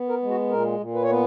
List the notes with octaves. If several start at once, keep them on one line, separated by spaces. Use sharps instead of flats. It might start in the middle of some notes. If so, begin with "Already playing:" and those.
Already playing: B3
A#4
G#3
F#4
A#2 A#4
A#2
B4
C#5
B3 B4